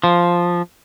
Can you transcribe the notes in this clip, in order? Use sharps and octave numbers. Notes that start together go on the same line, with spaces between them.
F3